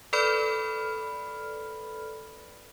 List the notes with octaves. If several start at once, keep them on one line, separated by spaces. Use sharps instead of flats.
A4 B4 D5 B5 F6